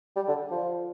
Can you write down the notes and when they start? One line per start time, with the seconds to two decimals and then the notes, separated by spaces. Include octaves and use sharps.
0.16 G3
0.28 D3
0.51 F3